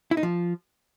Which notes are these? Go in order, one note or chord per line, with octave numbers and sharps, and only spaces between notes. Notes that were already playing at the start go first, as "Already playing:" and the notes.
E4
D#4
F3